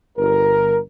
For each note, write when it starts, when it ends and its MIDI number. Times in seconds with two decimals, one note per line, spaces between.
0.18 0.77 31
0.18 0.77 70